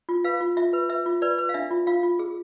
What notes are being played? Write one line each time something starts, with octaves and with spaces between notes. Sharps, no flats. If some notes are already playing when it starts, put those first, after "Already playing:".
F4
B4 F5
F4
F4 E5
B4
B4 E5
F4
B4 D5
B4
F5
D4 E5
F4
F4 F5
F4
G#4